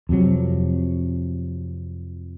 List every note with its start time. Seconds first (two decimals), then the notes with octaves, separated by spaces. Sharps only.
0.09 F2 C3 F#3